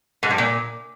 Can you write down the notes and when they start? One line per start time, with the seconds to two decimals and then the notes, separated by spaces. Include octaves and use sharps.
0.23 G#2
0.30 G2
0.38 A#2